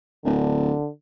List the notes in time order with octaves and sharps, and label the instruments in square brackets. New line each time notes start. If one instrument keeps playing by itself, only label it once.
[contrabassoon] D1 [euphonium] D3